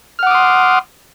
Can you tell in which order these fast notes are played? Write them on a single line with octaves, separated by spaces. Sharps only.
F6 F#5 D6 D#6 C6